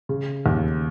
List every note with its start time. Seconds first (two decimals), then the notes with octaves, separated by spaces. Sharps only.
0.09 C#3
0.46 D#2